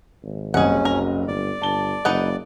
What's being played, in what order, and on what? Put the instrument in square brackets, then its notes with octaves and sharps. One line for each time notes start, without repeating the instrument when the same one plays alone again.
[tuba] G#1
[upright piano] F#1 C2 D#5 [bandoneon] C#4 [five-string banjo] G#4 F#5
[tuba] F#2 [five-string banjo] A#4
[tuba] G1 [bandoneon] D5
[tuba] G1 [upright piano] A5 G7
[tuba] F#1 [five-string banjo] D#4 B4 F#5